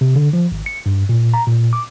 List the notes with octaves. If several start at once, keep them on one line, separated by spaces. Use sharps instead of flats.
C3
D3
F3
G#1
C#7
G2
A#2
A#5
A#2
D6